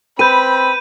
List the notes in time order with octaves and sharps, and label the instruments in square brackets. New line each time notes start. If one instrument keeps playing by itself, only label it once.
[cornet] C4 [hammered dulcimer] B4 [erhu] B5 [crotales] G6 D#7